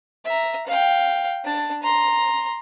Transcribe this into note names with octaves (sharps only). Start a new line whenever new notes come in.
E5 A#5
F5 G5
D4 A5
A#5 C6